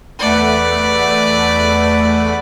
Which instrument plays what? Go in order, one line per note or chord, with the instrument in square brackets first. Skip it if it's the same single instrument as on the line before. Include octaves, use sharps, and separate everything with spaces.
[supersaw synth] E2 A3 F#5 [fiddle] B4 D5